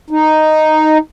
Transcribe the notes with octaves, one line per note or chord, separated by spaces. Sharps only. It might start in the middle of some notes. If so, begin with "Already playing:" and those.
D#4